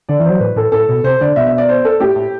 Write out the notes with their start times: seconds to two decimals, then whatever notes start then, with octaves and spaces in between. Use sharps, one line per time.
0.09 D3 D5
0.20 E3
0.25 F#3 C5
0.40 A2 B4
0.56 A2 A4
0.72 A2 A4
0.89 B2
1.04 C3 C5
1.21 D3 D5
1.36 B2 E5
1.47 E5
1.58 D5
1.69 C5
1.85 A4
2.00 A2 G4
2.16 A2